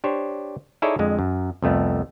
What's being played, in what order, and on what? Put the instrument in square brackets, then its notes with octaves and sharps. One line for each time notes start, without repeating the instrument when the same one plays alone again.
[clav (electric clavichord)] D4 G4 C5 C#5
D#4 E4 G#4 A4 C#5 D5
F2 D3 G#3
F#2
C2 F2 A3 B3